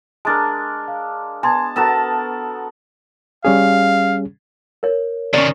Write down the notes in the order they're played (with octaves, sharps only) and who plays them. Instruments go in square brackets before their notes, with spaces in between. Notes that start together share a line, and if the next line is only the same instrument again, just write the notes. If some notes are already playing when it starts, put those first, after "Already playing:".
[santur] G#3 D4 A#4 [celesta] A5 A6
[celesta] F5
[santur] B3 [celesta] G#5 C6 G#6 [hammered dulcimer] A5
[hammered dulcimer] B3 A#4 A5 [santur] F#4 A4 [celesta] A6 E7
[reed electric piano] G3 C#4 G#4 [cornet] F5
[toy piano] A#4 C#5
[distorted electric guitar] C3 D#3 [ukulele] C#4 D#4 D5